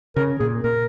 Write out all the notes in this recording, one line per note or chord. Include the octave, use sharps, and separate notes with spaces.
C#3 A#4
A#2 G#4
A#2 A#4